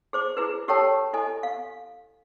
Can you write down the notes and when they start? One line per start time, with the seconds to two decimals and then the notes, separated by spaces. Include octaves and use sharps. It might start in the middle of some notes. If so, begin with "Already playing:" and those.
0.13 G#4 C5 D6
0.37 E4 G#4 B4
0.68 G4 A4 A#4 C#5 G5 A5
1.13 E4 A4 D#5 G#5
1.43 F5